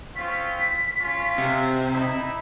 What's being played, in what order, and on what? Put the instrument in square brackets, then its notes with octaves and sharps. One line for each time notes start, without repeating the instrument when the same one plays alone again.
[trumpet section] C4 C#4 F4 [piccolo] B6
[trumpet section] C#4 F4
[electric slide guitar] C3
[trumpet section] D#4 E4